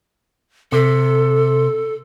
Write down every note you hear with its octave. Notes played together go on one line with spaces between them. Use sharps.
C3 A4